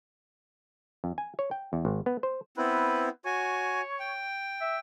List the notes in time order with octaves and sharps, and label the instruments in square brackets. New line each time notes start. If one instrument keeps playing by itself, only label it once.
[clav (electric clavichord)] F2
G#5
C#5
G5
E2
G#1
B3
C5
[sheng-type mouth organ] B3 C4 E4 [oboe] B4
[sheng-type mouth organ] F#4 G#5 [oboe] C#5
[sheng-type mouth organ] G5
[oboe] E5